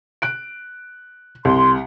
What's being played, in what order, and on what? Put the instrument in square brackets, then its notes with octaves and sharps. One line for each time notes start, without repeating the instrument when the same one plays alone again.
[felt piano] F#6 D7
[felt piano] C2 [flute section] C6